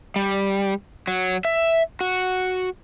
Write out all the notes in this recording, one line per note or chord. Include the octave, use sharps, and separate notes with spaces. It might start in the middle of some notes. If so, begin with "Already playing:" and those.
G3
F#3
E5
F#4